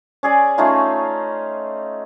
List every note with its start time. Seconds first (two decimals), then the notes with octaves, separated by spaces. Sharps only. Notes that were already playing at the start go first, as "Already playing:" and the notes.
0.23 C#4 G#4 D5
0.58 A3 C#4 D#4 F4